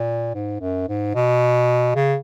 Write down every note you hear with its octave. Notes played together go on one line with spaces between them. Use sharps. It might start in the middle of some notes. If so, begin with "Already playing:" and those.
Already playing: A#2
G#2
F#2
G#2
B2
C#3